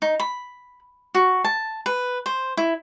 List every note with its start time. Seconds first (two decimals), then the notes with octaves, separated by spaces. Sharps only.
0.02 D#4
0.20 B5
1.15 F#4
1.44 A5
1.86 B4
2.26 C5
2.57 E4